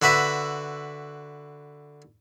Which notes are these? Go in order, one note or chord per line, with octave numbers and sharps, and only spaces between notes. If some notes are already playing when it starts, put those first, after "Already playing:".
D3 F#4 B4 E5